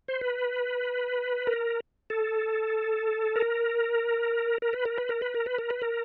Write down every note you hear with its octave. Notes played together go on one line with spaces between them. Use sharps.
C5
B4
A#4
A4
A#4
A#4
B4
A#4
B4
A#4
B4
A#4
B4
A#4
B4
A#4